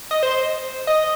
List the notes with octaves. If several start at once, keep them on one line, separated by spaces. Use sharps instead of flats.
D#5
C5
D#5